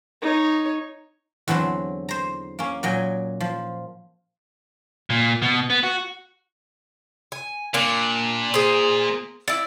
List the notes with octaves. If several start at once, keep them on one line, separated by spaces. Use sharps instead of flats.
D#4 C#5
E2 D3 F#3 C4
C5 A#5
A#3 C#4
A#2 F#3 D#5 G5 G#5
F3
A#2
B2
B3
F#4
G#5
A#2 A#3 D4
G#4 C5
E4 D5